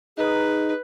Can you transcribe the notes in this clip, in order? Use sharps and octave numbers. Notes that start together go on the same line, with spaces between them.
D#4 G#4 B4